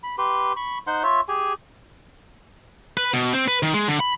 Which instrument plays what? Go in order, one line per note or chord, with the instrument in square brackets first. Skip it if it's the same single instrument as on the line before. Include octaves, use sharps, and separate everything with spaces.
[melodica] B5
G4 B4 C6
B5 C#6
D#4 C5 F#5 C6
F4 C#5 E5
G4 G#4 G#5
[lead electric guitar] B4
B2
C4
B4
D#3
G#3
D3
B5